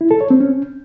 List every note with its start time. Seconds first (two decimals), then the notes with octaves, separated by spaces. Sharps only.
0.01 E4
0.11 A4
0.21 C#5
0.30 C4
0.40 C#4